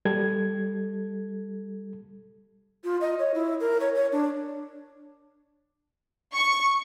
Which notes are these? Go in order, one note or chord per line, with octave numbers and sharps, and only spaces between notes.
G3 A4 G#6
F4
D#5
C#5
E4
A#4
C#5
C#5
D4
C#6